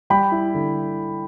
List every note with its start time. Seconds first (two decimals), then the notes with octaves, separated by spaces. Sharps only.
0.10 G3 G5 B5
0.32 E4
0.54 D3